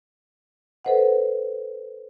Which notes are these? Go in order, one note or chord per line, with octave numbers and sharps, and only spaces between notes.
A4 B4 C5 D#5 F#5